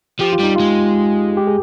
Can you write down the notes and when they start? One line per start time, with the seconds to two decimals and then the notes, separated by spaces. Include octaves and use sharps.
0.20 F3 G4
0.33 F4
0.40 G3 D#4
0.56 G#3 F4
1.37 G4
1.47 G#4